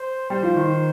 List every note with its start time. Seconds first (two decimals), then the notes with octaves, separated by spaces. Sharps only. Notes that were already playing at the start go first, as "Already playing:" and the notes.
Already playing: C5
0.30 G3 C5
0.43 F3
0.56 D#3